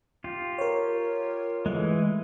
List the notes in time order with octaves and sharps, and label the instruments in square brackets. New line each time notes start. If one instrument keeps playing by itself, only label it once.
[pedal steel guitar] F4 G4
[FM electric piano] A#4 C#5
[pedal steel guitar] E3 G#3 [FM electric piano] A3